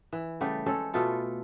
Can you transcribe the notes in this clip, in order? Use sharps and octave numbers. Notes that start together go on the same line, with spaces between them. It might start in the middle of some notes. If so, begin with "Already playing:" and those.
E3
C#3 G3 A3 G4
G#3 C#4 A4 C5
B2 A3 F4 A4